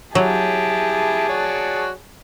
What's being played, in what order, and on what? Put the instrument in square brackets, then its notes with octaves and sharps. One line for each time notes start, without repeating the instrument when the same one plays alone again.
[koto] F#3 [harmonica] E4 G4 [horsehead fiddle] G#4 A5
[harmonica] F#4 C#5 D5